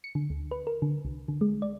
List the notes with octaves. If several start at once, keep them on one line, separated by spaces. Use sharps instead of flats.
C#7
D3
D2
B4
A#4
D3
C2
D3
G#3
D5